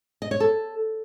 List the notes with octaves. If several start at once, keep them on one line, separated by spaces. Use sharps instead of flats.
D#5
C#5
A4